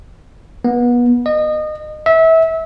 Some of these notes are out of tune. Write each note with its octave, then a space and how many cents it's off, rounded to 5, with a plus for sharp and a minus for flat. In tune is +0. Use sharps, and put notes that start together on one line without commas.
B3 -30
D#5 -25
E5 -25